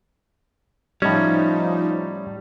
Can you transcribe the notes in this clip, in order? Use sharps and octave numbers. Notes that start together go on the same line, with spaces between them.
A2 F3 G3 C#4 D#4